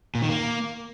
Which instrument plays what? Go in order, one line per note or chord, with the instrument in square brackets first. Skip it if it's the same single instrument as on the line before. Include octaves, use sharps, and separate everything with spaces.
[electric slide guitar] A#2
D#3
A#3